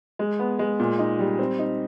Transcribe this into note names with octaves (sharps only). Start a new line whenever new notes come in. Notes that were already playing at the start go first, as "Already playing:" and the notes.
G#3
B3
G#3
A#2
D#4
G3
C4
D#4